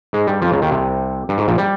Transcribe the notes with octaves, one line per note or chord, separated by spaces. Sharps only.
G#2 G#3
G2 G3
F2 F3
C#2 C#3
D#2 D#3
C2 C3
G2
G#2
A#1 A#2
G3